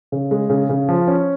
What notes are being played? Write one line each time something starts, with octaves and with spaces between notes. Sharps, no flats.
C#3
G#3
C#3
C#3
F3
C#4